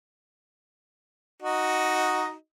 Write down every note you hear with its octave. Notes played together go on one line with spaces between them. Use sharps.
D#4 F#4 D#5